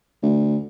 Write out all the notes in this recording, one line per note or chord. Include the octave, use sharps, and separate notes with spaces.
D2